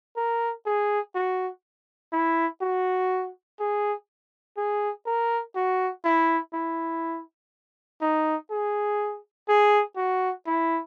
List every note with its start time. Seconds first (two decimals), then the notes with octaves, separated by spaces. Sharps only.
0.17 A#4
0.66 G#4
1.15 F#4
2.12 E4
2.62 F#4
3.60 G#4
4.57 G#4
5.06 A#4
5.56 F#4
6.05 E4
6.54 E4
8.02 D#4
8.51 G#4
9.49 G#4
9.96 F#4
10.46 E4